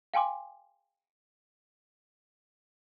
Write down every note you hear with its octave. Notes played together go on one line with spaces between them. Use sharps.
F5 G5 G#5 C6 D6